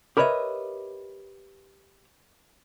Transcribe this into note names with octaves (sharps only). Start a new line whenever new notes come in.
G4 A#4 B4 C#5 D#5 E5